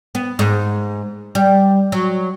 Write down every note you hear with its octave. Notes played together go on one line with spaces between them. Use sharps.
B3
G#2
G3
F#3